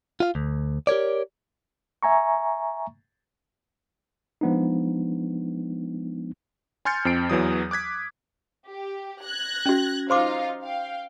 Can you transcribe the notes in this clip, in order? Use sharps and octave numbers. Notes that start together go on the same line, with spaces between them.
F4 F5
D2
G4 A#4 C#5 D5
E5 G#5 A#5 C#6
F3 G#3 B3 D4 D#4
G#5 C6 F6 G6 A6 C#7
F2 C4 C7 D7
E2 E3 F#3 D#6
D6 F#6 G#6 B6
G4
F#6 G#6 A#6
C#4 F#4
D#4 F4 C5 F5 C6 D6
F5 G5